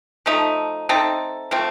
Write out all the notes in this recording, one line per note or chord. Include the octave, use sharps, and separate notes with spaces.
F3 A3 D#4
A3 C4 D#4 A4
F3 A3 C4